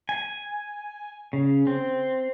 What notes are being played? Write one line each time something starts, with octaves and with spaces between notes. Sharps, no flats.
G#5
C#3
C4